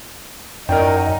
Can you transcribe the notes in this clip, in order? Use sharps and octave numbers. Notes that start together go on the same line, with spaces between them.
F#2 D#4 A#4 D5 G5